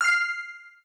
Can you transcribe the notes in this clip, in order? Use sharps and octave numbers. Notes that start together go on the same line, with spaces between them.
F6 C7